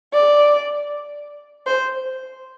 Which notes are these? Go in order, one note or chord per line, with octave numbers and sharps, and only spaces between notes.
D5
C5